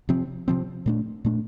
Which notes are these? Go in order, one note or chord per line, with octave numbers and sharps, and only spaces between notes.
C3 F3 C4
C3 F3 C4
A#2 A3 D4
A#2 A3 D4